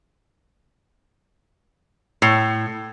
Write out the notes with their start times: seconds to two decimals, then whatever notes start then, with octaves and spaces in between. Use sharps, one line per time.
2.22 A2